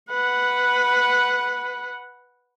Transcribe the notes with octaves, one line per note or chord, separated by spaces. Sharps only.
B4 F#5